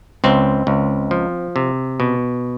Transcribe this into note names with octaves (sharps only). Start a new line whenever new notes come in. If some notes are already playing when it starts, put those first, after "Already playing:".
C#2 C4
C#2
F3
C3
B2